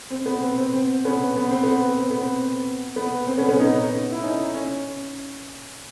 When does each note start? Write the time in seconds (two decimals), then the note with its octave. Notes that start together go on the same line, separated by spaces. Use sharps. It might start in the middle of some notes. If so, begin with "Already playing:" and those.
0.10 C4
0.26 B3
0.41 C4
0.57 C4
0.73 C4
1.04 B3 C#4
1.36 B3
1.51 C4
1.63 B3
2.01 C4
2.10 B3
2.22 C4
2.96 B3
3.27 C4
3.38 B3 C#4
3.49 B3 C#4
3.59 C#4 D#4
4.12 E4
4.23 C#4 D#4
4.54 C#4